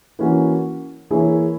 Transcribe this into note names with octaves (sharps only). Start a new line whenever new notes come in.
E3 A#3 C#4 F#4
E3 A#3 E4 G#4 C#5